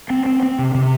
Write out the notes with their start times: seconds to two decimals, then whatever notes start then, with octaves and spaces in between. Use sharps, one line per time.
0.10 C4
0.26 C4
0.43 C4
0.59 C3
0.75 C3